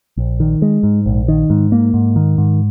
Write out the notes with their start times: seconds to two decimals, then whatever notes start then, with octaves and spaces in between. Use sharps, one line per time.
0.17 A#1
0.40 D#3
0.62 G#3
0.83 G#2
1.06 A#1
1.28 D#3
1.50 G#2
1.72 A#3
1.94 G#2
2.16 D#3
2.38 G#2